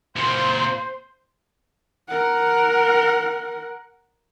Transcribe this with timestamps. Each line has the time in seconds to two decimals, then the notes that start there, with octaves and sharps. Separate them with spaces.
0.16 C#2 A#2 C5
2.08 A#4 F#5